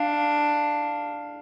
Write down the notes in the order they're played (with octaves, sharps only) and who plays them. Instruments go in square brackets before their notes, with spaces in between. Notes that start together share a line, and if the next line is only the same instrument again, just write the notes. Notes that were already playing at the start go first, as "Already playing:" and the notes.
Already playing: [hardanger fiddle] D4 [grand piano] F5